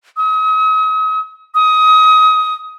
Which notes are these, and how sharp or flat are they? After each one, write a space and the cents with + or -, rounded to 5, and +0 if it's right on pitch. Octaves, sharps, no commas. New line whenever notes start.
D#6 +40
D#6 +25